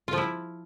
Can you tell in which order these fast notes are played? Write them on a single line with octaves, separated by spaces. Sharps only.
F4 F3 E4